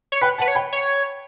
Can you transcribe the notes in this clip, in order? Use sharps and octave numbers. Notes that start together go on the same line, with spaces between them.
C#5
B4 G5 B5
B4 F#5 A5
C#5
G5 B5
C#5